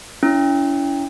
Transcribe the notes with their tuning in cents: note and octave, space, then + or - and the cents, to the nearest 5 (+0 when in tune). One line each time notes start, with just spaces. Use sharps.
C#4 +35 E4 +0